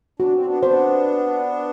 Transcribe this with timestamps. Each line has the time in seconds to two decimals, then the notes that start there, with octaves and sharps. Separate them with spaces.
0.20 D4 F#4
0.33 C4
0.46 B3 D4
0.63 B3 D4 C5